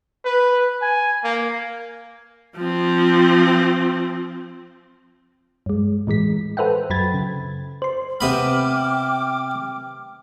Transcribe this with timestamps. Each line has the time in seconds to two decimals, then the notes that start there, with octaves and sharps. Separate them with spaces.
0.25 B4
0.82 G#5
1.24 A#3
2.57 F3 C4
5.66 G2 G#3
6.07 A2 E3 G#3 B6
6.57 A4 B4 C5 E5 F#5 G5
6.90 F#2 F#3 B5 G#6 A6
7.14 C#3
7.82 C5 C6
8.21 C3 B3 G5 B5 D6 F6